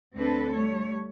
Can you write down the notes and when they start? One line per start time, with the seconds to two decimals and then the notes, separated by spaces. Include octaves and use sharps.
0.15 D2 C4 D4 A4 B4
0.52 G3 A3 C#5